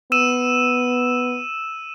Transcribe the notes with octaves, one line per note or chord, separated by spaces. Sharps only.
B3 E6 D#7 E7